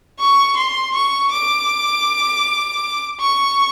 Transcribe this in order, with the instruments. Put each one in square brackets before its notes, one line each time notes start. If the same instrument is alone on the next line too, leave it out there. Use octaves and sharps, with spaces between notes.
[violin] C#6
C6
C#6
D6
C#6